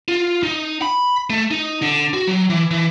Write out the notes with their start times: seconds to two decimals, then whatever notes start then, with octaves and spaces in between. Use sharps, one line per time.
0.08 F4
0.43 D#4
0.82 B5
1.30 A3
1.51 D#4
1.82 D3
2.13 F#4
2.27 F#3
2.50 E3
2.71 E3